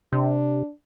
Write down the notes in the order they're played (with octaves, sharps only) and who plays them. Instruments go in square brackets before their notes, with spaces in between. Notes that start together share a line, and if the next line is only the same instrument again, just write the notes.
[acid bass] C3 [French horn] D4